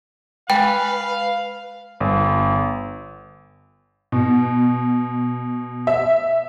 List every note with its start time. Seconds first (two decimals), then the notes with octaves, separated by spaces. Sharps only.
0.50 G#3 B4 F5 G5 G#5
2.00 G1
4.12 B2
5.87 E5